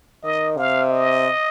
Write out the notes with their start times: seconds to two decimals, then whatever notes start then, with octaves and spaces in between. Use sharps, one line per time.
0.23 D#3 D#5
0.57 C3 F5
0.91 D#5